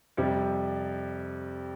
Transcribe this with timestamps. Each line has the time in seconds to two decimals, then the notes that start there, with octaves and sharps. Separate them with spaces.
0.17 F2 C3 G3